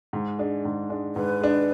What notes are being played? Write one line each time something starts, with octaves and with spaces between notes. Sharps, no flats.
G#2
G#3 D4
G#2
G#3 D4
G#2 B4
G#3 D4